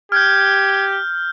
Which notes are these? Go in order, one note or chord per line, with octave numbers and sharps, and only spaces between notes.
G4 F6 G6 G#6